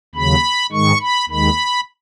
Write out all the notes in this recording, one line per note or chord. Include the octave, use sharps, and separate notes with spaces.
D#2 C#3 F#3 B5
G#2 D#3 G#3 C#6
B5
D#2 D#3 G#3 B5